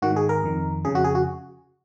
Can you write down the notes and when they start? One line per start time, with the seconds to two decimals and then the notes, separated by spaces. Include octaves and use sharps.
0.02 G#2 D#3 F#4
0.16 G#4
0.29 A#4
0.43 F2 D#3
0.85 F2 C#3 G#4
0.95 F#4
1.04 G#4
1.15 F#4